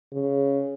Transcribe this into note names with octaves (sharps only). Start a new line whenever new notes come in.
C#3